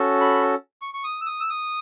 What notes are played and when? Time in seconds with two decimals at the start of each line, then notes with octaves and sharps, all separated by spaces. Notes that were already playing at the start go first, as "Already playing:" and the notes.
Already playing: C#4 F#4 A4
0.21 B5
0.82 C#6
0.94 C#6
1.04 D#6
1.21 E6
1.26 D#6
1.40 E6
1.50 D#6